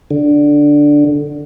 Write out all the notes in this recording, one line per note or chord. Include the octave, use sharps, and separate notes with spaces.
D3